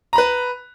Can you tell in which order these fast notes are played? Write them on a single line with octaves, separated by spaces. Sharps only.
A#5 B5 B4